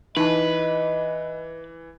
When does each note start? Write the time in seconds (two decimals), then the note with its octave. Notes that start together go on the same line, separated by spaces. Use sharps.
0.17 E3 D#4 B4 D#5 A5